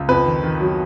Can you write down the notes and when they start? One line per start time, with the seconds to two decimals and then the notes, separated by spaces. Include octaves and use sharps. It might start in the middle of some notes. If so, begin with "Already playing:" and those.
Already playing: C#2
0.08 F2 B4
0.26 D#3
0.44 D#3
0.61 F#3